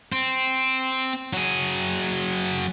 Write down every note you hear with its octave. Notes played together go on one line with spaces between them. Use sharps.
C4
F#3 G#4